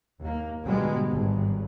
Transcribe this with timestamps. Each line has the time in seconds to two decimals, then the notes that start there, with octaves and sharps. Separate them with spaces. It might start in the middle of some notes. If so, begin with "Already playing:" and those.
0.21 D#2 A#3
0.65 G#2 B2 D3 G3 G#3 B3
1.07 G#1 G2